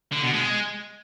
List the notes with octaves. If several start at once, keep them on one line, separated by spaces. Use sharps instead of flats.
D3
B2
G#3